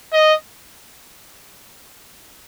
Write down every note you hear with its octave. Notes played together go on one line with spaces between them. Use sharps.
D#5